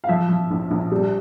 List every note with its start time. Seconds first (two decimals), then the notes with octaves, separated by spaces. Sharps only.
0.04 F5
0.09 F3 E5
0.29 F3
0.51 A#1
0.71 A#1
0.92 G3